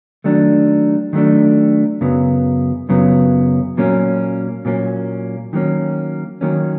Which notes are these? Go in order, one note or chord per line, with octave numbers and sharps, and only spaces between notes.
D#3 F#3 A3 D4
D#3 F#3 A3 D4
F#2 C#3 F#3 B3
F#2 C#3 F#3 B3
A#2 F#3 A#3 C#4
A#2 F#3 A#3 C#4
D#3 F#3 A#3 C#4
D#3 F#3 A#3 C#4